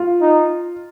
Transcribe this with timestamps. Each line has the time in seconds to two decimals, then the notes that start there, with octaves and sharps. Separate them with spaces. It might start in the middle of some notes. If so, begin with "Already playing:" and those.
Already playing: F4
0.21 D#4